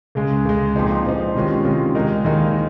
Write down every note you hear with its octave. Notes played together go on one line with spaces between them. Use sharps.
C#2 C#3 G#3
C#2 C#3 G#3
A#2 F3 C4 D#4
A#2 F3 C4 D#4
C3 D#3 G#3 C#4 F4
C3 D#3 G#3 C#4 F4
D#2 D#3 G#3 D#4 A#4
D#2 D#3 G#3 D#4 A#4